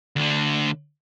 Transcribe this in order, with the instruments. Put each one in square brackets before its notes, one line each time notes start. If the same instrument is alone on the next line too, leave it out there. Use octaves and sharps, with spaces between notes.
[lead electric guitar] D2 D3